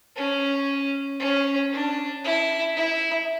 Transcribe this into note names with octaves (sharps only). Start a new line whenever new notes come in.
C#4
C#4
D4
E4
E4